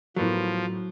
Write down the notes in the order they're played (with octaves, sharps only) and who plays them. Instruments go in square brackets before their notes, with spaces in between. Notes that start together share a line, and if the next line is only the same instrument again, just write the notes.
[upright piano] A2 B3 A#4 [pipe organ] F3 [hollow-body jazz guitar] F#3